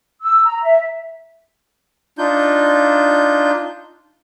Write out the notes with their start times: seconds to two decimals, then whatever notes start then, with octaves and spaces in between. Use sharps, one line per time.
0.22 E6
0.44 A#5
0.63 E5
2.18 D4 D#4 F4 G6